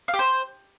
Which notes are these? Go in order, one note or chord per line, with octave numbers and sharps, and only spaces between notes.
F5
G4
C5